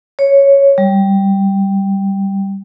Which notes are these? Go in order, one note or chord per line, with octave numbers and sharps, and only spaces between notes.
C#5
G3